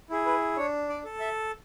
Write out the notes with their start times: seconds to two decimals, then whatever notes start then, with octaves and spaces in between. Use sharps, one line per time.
0.10 E4 G#4
0.26 B4
0.57 D4 C#5
0.89 D5
1.04 A4
1.20 E5